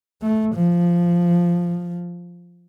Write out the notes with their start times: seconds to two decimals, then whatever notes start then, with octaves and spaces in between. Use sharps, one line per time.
0.22 A3
0.56 F3